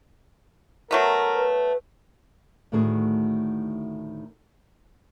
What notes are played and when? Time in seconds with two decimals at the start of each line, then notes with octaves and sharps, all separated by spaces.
0.91 F#3 A3 B3 A#4
1.35 B4
2.72 D2 A2 D#3 A3 F#4 G#4